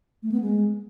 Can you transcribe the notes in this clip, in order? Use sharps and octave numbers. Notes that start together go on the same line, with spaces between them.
A3
B3
G#3